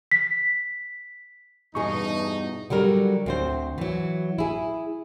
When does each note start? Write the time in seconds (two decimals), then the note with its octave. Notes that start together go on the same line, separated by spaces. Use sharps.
0.11 B6
1.75 E2 G2 B2 C#4 D#4 G#4 D#5 C#6
2.70 D3 F#3 G3 A#4
3.26 D2 C4 C5
3.78 E3 F#3
4.38 E4 G#4